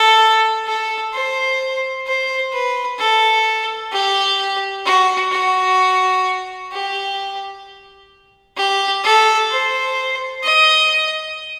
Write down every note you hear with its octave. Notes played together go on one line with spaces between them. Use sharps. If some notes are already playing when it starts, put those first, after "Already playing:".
Already playing: A4
A4
C5
C5
B4
A4
G4
F#4
F#4
G4
G4
A4
C5
D#5